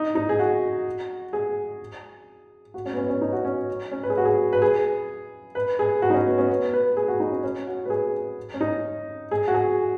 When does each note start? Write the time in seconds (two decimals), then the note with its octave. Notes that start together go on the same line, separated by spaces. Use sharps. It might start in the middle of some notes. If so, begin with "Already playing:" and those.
Already playing: D#4
0.15 D#4
0.29 G#4
0.39 F#4
1.33 G#4
2.74 F#4
2.85 C#4
2.93 B3
2.97 C#4
3.09 C#4
3.21 D#4
3.33 F#4
3.45 C#4
3.92 C#4
4.03 B4
4.10 G#4
4.18 F#4
4.25 G#4
4.53 B4
4.62 G#4
5.55 B4
5.79 G#4
6.02 F#4
6.10 D#4
6.14 C#4
6.27 B3
6.38 C#4
6.49 B3
6.73 B4
6.97 G#4
7.08 F#4
7.20 D#4
7.31 C#4
7.43 C#4
7.67 F#4
7.85 B4
7.90 G#4
8.54 C#4
8.61 D#4
9.31 G#4
9.48 F#4
9.54 G#4